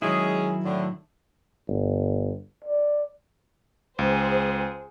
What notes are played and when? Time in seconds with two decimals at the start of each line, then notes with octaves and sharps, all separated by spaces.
0.02 D#3 F#3 G#3 C#4 E4 G#4
0.64 A2 D3
1.68 G1
2.64 D5
3.99 C#2 G#4 C5